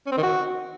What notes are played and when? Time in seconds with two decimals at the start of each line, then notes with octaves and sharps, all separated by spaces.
0.06 C#4
0.12 C4
0.17 D#3
0.23 F#4